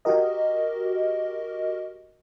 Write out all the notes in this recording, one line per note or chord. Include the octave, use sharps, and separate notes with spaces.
F#4 G4 A#4 D#5